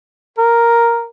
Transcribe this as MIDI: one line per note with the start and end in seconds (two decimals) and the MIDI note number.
0.38 1.06 70